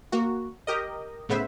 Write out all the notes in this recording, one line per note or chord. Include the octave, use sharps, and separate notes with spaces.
A#3 F#4
G4 A#4 D#5
A2 C#3 B3 B4 C5 E5